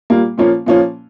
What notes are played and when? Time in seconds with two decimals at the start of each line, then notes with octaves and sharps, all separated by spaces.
0.10 A#2 G3 A#3
0.38 A#2 F3 A#3 C#4
0.66 A#2 F3 A#3 C#4